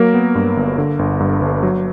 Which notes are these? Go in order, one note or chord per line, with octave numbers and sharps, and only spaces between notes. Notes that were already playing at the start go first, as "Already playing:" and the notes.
Already playing: F#3 A#3 A#4
B3
G2
G1
D3
G1
G2
G1
F#3